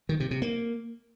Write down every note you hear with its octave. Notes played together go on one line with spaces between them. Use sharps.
D#3
C3
C3
A#3